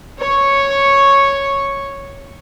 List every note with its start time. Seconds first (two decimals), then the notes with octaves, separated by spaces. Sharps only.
0.18 C#5 C#6